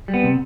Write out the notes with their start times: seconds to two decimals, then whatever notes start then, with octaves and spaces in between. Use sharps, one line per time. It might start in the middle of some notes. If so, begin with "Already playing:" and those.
0.08 G3
0.14 B3
0.23 C3